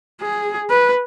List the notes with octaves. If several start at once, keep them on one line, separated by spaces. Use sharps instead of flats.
G#4
B4